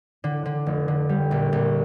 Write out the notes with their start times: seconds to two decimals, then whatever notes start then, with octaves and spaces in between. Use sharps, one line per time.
0.24 D3
0.46 D3
0.66 F1
0.88 D3
1.09 G3
1.31 A#1
1.53 A#1